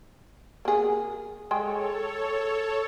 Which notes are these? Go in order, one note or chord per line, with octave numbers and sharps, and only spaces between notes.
A#3 G#4
G#3 G#4 A4 C#5 G5